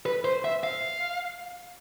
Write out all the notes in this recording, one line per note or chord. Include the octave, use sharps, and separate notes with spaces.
B4
C5
E5
F5